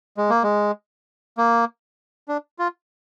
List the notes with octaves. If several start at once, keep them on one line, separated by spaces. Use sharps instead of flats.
G#3
A#3
G#3
A#3
D4
F4